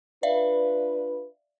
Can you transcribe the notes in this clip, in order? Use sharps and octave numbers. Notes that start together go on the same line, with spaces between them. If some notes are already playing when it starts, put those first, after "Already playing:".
D4 F4 B4 D5 E5 F5